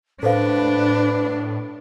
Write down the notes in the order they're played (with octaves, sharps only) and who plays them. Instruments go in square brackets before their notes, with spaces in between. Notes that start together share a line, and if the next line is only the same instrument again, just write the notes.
[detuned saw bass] A2 [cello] D4 [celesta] A4 C5 F5 [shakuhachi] B4